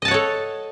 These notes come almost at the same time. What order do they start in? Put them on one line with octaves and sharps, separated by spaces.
D#5 A5 F#5 C#5 A4